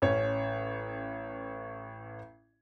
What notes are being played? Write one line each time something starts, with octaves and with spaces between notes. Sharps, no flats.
A1 C#4 C#5